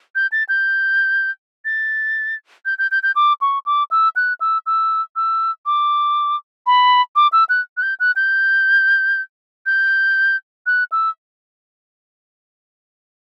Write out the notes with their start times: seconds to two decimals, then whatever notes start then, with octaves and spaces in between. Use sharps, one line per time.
0.15 G6
0.32 A6
0.49 G6
1.65 A6
2.66 G6
2.79 G6
2.91 G6
3.03 G6
3.16 D6
3.41 C#6
3.66 D6
3.91 E6
4.16 F#6
4.41 E6
4.66 E6
5.16 E6
5.66 D6
6.66 B5
7.16 D6
7.32 E6
7.49 F#6
7.77 F#6
7.83 G6
8.00 F#6
8.16 G6
9.66 G6
10.66 F#6
10.92 E6